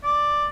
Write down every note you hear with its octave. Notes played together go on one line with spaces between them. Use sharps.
D5